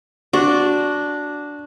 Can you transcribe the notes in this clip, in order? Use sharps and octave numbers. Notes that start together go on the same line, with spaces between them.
D4 F#4 C#6